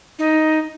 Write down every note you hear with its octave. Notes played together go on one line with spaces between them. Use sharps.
D#4